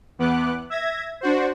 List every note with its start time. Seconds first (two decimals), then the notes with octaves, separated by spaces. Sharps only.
0.19 E2 B3 D6 F#6
0.70 E5 G#6 A#6
1.21 D4 F#4 C5